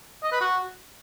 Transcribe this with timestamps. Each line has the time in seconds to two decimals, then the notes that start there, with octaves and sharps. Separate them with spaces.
0.23 D#5
0.32 B4
0.41 F#4